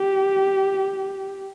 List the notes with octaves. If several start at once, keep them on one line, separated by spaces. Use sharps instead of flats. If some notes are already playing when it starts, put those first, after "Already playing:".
Already playing: G4